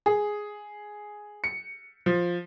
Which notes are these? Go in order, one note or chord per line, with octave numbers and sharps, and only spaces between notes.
G#4
C#7
F3